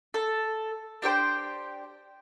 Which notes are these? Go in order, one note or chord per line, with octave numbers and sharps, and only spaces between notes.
A4
D4 G4 C5 G5